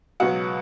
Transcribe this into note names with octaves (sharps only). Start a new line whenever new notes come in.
C#2 B2 F#3 B3 F#4 F#5